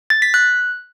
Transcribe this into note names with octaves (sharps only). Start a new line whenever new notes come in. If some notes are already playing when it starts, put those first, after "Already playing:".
A6
B6
F#6